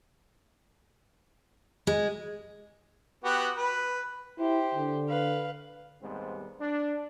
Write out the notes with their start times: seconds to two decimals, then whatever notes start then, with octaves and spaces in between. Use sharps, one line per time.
1.87 G#3
3.24 B3 F#4 G4
3.57 B4
4.39 E4 G4 C5
4.75 D3
5.07 B4 F5
6.02 D#2 G#2 G3 B3 C4
6.60 D4